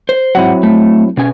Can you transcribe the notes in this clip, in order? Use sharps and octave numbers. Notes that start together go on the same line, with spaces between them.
C5
G#2 B2 F#3 C4 E4 F#5
A3
B2 C#4 G#5